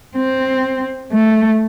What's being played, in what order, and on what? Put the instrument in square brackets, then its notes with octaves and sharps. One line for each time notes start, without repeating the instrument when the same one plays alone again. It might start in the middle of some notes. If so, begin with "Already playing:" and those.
[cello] C4
A3